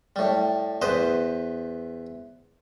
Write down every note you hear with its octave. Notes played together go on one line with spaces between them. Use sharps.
A2 G3
E2 B4 C5 D#5 D6